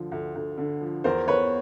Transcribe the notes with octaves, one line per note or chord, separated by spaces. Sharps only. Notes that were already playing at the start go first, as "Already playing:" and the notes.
Already playing: D2 D3 F3
D2
D2
D3
F3
E2 A#4 C5
E2 B4 C#5